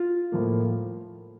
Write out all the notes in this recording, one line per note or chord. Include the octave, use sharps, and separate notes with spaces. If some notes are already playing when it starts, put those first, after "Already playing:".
Already playing: F4
A2 F3 A#3